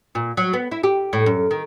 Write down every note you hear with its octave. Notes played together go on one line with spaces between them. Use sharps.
A#2
F#3
B3
E4
G4
A2
F#2
D#3